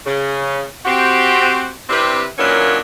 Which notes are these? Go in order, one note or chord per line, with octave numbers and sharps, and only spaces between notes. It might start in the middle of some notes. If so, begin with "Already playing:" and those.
C#3
C4 F#4 G4
C3 C4 D4 E4 G4 B4
A#2 E3 F#3 A#3 C#4 D4